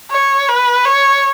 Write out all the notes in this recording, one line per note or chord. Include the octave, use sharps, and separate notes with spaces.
C#5
B4
C#5